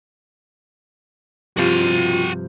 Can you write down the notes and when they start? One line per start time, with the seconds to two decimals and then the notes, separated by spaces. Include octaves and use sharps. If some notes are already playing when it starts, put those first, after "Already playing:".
1.57 G2 C3 F3 F4 F#4 F5